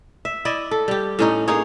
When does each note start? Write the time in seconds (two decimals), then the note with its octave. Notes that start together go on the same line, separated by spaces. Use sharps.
0.25 E5
0.45 E4 D5 D#5
0.71 A4
0.88 G3 G4
1.19 A2 C#4 D#4
1.48 A#3 D#4 G#4 C#5